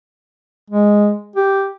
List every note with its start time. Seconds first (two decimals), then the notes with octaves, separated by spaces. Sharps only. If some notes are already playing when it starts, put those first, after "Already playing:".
0.70 G#3
1.36 G4